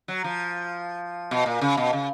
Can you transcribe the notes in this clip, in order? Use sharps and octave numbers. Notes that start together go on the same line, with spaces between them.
F#3
F3
B2
A#2
C#3
B2
C#3